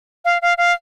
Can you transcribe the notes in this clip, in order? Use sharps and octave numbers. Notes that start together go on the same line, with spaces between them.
F5
F5
F5